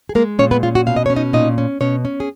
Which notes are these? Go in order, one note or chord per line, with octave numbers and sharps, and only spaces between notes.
G#4
G#3 A#3 A#4
A#2 C#4 C#5
B3 B4
C#4 F4
F#4
B2 F5
D#5
C#4 C#5
D#4 D#5
A#2 D#4 D#5
C#4
B2 C#4 C#5
C#4
G#4